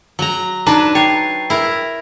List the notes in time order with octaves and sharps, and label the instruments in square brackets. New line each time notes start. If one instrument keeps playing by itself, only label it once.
[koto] F#3 A#5
[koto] D4 B4 [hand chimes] D#4 A#5 D6
[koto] C#5 [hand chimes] G5 A6 C7
[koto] E4 A#4